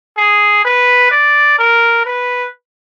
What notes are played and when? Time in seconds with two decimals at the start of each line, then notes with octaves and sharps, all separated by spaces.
0.18 G#4
0.65 B4
1.12 D5
1.59 A#4
2.06 B4